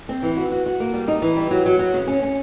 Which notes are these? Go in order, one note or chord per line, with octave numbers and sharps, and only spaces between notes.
C4
E3
F#4
F#4
F#4
A#3
G3
D#4
E3
G3
F#3
F#3
F#3
C#3
C#4
C#4